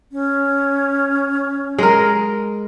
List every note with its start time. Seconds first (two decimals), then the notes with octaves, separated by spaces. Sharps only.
0.12 C#4
1.78 G#3 A#4